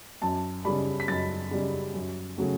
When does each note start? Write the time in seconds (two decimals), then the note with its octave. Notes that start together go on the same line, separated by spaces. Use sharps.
0.22 F#2 A5
0.65 C#3 G3 B5
1.00 B6
1.08 F#2 A6
1.51 C#3 G3
1.95 F#2
2.37 C#3 F#3 A3